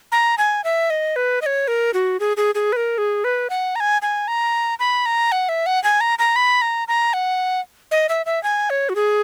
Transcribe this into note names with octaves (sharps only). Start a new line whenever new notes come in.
A#5
G#5
E5
D#5
B4
D#5
C#5
A#4
F#4
G#4
G#4
G#4
B4
A#4
G#4
B4
F#5
A#5
G#5
G#5
A#5
B5
A#5
F#5
E5
F#5
G#5
A#5
A#5
B5
A#5
A#5
F#5
D#5
E5
E5
G#5
C#5
F#4
G#4